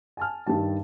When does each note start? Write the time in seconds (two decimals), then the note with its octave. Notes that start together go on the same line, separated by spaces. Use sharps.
0.17 G#5 A5 F6
0.47 G2 D#3 G3 A5